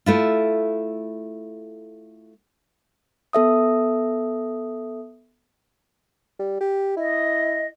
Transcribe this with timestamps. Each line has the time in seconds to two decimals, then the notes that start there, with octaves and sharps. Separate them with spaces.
0.06 A3 E4 F4
3.33 B3 A4 E5 D#6
6.39 G3
6.61 G4
6.97 E4 D#5